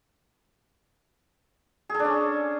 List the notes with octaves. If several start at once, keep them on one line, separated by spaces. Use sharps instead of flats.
C#4 D4 G#4 A4